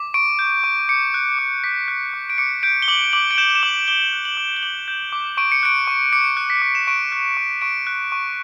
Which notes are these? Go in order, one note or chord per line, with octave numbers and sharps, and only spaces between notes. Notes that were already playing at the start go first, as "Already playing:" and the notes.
Already playing: D6
C#6 D7
G6
C#6
D6 C#7
F#6
D6
D6 B6
F#6
D6
D7
D6 C#7
G6 D7
G7
D6 F#7
D6 F#7
D7
G6 E7
E7
D6 F#7
D6 G7
F#6
F#7
D6
G7
D6 F#7
G6
D6
C#6 D7
C#7
F#6 D7
C#6
D6 C#7
F#6
B6
D6
E7
C#6 D7
F#6
C#6
C#6 D7
F#6
C#6